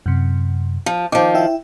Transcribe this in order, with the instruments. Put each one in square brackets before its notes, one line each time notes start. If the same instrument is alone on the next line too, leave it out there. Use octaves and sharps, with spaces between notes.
[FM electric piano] F#2 C3
[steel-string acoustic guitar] F3
[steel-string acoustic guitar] D#3 F3 [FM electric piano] D6
[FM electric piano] E4 E5 G5